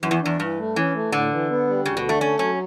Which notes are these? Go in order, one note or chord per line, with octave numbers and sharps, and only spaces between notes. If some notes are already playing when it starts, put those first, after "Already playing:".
F#2 E3
E2
E2 D4
G2 E3
A3
E3 C#4
A3
A2 D3
E3
B3
G3
D2 C#3
B2
D3
A3
A3 C#4
F#3 C#4